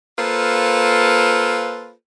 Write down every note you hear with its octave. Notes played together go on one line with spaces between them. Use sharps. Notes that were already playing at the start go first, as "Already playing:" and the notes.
A#3 F4 A4 B4 C5